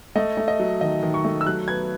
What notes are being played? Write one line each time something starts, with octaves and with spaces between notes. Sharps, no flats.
A3 D#5
A3
D#5
F#3
D#3 D#5
D#3
C#6
A3
E6
F#3 F#6
B3 G#6